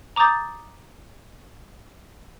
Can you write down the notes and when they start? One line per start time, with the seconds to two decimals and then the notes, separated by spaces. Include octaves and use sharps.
0.16 A#5 D6 D#6 G6 A6